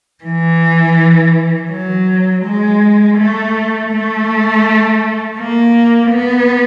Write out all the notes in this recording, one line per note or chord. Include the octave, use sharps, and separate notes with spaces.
E3
F#3
G#3
A3
A3
A#3
B3